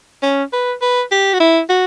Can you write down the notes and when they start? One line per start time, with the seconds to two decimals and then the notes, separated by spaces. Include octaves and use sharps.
0.23 C#4
0.53 B4
0.82 B4
1.11 G4
1.34 F#4
1.40 E4
1.69 F#4